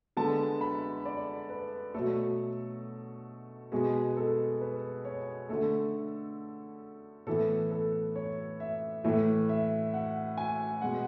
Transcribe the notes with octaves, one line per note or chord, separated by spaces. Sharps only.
D3 G#3 B3 A5
B5
D5
B4
B2 F#3 A3 A4
B2 G#3 B3 G#4
A4
B4
C#5
D3 A3 A4
A2 E3 B3 A4
A4
C#5
E5
A2 E3 A3 E5
E5
F#5
G#5
B2 G#3 B3 F#5